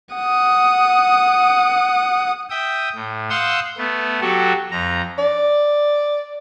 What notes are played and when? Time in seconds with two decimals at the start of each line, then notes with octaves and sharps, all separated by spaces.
0.15 F#5 D#6
2.50 E5 G5 D#6
2.95 A2
3.30 F5 F#5 C6 D#6 E6 G6
3.77 A3 B3
4.21 F#3 F#4 G4 A4
4.71 F2 A#5
5.18 D5